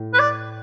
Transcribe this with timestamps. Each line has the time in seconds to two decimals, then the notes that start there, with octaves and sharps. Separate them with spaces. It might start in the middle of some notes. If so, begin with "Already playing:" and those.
Already playing: A2
0.14 B4
0.19 D5